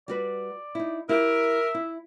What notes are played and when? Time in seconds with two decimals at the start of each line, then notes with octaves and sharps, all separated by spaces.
0.08 G3 F#4 B4 D5
0.75 D#4 E4
1.09 E4 G4 A#4 E5
1.74 E4